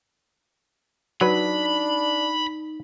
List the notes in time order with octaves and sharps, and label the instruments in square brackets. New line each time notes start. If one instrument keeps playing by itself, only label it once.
[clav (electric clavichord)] F#3 B4 [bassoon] D4 [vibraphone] D#4 [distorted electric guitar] B5